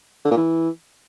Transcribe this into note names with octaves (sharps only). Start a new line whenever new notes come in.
D3
A#2
E3